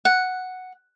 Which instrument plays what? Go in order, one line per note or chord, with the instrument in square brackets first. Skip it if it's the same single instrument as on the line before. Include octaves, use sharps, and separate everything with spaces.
[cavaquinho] F#5